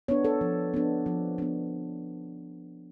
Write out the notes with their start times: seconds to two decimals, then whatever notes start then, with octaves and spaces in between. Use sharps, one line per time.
0.08 B3 D4 C#5
0.24 A4
0.41 F3
0.74 B3 D4
1.06 F3
1.38 B3 D4